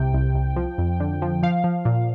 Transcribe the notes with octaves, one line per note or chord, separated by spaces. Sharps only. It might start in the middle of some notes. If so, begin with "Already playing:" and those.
Already playing: C2 C3 G5
C2
C2
F3
F2
D3
F3
F3 F5
F3
A#2